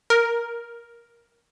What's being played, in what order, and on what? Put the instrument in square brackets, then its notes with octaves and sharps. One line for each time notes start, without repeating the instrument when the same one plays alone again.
[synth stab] A#4